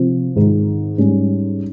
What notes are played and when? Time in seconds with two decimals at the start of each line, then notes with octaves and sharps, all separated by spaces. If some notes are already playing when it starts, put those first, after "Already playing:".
Already playing: C3 F3 C4
0.36 G#2 D#3 G#3
0.98 G#2 G3 C#4